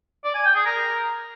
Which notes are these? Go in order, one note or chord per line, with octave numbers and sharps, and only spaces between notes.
D5
G#5
G5
G#4
A#4